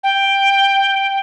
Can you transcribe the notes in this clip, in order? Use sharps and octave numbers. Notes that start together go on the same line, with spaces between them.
G5